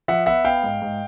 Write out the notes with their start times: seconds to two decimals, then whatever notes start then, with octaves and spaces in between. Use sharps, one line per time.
0.08 F3 E5 F#5
0.26 B3 E5 F#5
0.45 B3 F5 G5
0.63 G#2
0.82 G#2